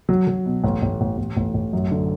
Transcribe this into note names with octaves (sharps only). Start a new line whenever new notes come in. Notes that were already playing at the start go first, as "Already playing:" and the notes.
F#3
F#3
B2
A1
A1
A1
A1
A1
A1
F#2
D3